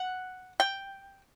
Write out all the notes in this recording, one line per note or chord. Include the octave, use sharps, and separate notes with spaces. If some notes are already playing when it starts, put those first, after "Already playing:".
Already playing: F#5
G5